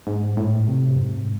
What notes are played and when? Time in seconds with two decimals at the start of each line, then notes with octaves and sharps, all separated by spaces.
0.07 G#2
0.37 A2
0.68 C3
0.96 F#2
1.00 G#2